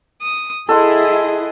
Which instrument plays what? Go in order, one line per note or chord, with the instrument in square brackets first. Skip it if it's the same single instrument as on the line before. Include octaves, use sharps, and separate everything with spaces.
[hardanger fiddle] D#6
[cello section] E4 G#4 [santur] A4 F#5 C6 [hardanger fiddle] D#5